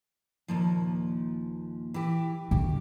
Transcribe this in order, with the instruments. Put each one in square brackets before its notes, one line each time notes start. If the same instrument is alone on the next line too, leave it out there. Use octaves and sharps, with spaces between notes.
[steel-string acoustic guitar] D#2 A#2 F3
E3 G4
[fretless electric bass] D#1 D3 [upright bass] B2 [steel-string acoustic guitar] G4